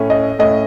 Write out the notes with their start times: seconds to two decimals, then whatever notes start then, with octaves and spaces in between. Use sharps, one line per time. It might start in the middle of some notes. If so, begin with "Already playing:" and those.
Already playing: A2 A3 C#4
0.10 D#5
0.39 A2 A3 C#4 D#5